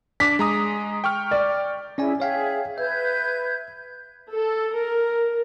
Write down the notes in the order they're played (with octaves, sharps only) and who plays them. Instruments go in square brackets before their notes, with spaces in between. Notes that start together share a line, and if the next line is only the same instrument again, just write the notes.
[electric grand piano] D4 D6 [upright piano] B6
[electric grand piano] G#3 A#5 D#6
G5 C#6 F6
[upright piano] D5
[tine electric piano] C#4 D5 G#5 [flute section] E4 G#4
[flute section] G#4 E5 [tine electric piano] C#5 F5 G5
[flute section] B4 G6 G#6 [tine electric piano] E5
[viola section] A4
A#4